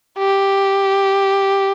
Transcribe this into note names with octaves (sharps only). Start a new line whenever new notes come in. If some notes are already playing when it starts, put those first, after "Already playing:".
G4